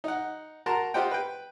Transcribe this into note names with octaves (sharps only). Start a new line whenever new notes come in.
D#4 F#5
F#4 A#4 A5 A#5 C6
F4 G4 C5 D#5 F#5 G5
B4 G5